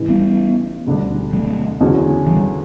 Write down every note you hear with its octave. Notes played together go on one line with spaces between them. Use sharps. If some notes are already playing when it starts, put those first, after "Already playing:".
Already playing: A1 A2 E3
G3 B3
E1 D2 D3 G3 D4
F#3 A3
E2 D3 F#3 C#4 F#4
E3 G3